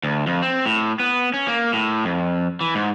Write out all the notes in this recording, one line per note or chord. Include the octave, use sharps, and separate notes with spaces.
D2
F2
C4
A2
B3
C#4
A#3
A2
F2
E3
G#2